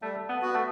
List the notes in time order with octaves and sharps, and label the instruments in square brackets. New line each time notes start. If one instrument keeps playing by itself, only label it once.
[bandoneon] G3 [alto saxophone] A3
[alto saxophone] B3
[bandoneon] B3 F#4
[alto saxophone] A3